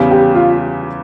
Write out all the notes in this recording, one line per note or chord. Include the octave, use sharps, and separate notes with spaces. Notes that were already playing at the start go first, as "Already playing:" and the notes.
Already playing: E2 C#3 G3
G4
F4